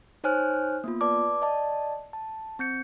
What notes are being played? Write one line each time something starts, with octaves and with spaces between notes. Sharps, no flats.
D#4 C5 C#5 G#5 F6 F#6
A#3 B3 F4
B4 D5 A5 D6
D5 D#5 A5
A5
C4 G6 C#7